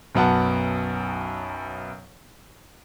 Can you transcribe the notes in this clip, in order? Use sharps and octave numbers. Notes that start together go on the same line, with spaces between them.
B1 F#2 B3 F#5 A5